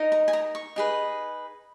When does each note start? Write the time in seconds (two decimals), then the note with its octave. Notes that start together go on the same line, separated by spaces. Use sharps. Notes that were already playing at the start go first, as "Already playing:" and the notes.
Already playing: D#4 A#4 D#5
0.12 A#5
0.28 G#5
0.33 A#5
0.55 C#6
0.76 D#4 G#4 B4